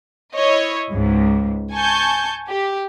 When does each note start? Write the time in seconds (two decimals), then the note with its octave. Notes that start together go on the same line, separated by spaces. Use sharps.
0.34 E4 C#5 D#5
0.92 C#2 G#2
1.72 G#5 A5 C#6 G6
2.47 G4